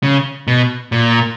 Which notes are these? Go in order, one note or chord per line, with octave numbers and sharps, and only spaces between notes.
C#3
B2
A#2